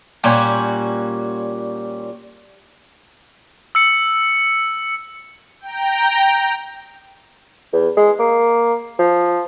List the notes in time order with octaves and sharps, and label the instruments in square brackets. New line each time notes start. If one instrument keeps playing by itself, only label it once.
[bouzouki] A#2 G3 C#4 F#4
[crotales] E6 C#7
[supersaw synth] G5 A#5
[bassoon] E2
G#3
A#3
F3